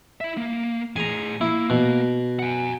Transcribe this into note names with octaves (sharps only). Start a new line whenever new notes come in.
E4 E5
A#3
A2 G#4 G#5 A#5
A#3 E4
B2
F#5 G#5